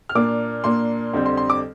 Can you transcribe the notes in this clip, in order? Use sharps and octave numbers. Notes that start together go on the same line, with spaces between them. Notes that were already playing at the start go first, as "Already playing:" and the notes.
F6
A#2 A#3 D4 D6
A#2 A#3 D4 C6
F2 D3 G3 C4
C6
C6
D6